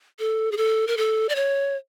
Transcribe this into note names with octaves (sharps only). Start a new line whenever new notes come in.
A4
G#4
A4
A#4
A4
D5
C#5